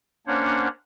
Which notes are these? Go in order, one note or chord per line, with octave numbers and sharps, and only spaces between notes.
A#3 C#4 D4 C5 C#5 F#5